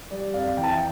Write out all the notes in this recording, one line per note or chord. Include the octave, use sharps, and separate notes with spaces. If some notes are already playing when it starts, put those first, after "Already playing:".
G3 D5
F2 D5 F5
E3 G5
A5
E5 G5